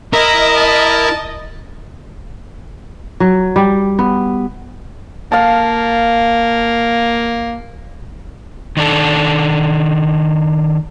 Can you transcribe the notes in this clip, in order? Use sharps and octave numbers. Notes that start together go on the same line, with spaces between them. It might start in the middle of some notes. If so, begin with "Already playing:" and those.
E4 A#4 D#5 A#5
A5
F#3
G3
B3
A#3 F5 A5
D#3 D4 A4